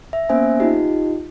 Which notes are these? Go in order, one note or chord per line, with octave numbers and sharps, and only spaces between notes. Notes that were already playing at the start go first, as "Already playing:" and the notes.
E5
A#3 B3 C#4 C5 E5 G#5
D#4 F4 G4 D#5